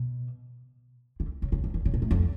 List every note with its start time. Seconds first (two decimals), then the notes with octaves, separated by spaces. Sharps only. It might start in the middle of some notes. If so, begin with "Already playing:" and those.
Already playing: B2
1.20 D3
1.42 C#3
1.52 C#3
1.64 E3
1.74 D#3
1.86 C#3
1.94 B2
2.02 A2
2.11 F2